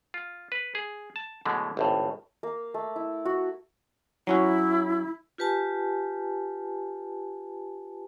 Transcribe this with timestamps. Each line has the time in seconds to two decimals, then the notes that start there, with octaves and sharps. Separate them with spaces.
0.14 F4
0.52 B4
0.75 G#4
1.16 A5
1.45 B2 D3 E3 F#3 G#3 A3
1.77 G#1 C#2 A2
2.43 A#3
2.74 A3
2.96 E4
3.25 F#4
4.27 F#3 C#4 E4 F#4
5.38 F4 G4 B4 G#5 A5